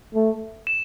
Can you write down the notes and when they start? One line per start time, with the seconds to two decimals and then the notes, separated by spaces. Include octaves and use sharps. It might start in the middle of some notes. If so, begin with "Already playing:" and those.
0.15 A3
0.67 E7